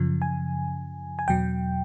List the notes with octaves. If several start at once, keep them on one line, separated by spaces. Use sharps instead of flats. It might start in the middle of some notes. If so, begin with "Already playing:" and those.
Already playing: F#2 C#3 F3
G#5
G#5
E2 B2 F#3 G5